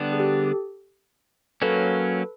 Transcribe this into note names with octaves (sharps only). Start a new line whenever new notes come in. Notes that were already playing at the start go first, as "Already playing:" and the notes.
Already playing: D3 G3 B3 D4
G#4
G4 A4
F#3 A#3 C#4 A4 B4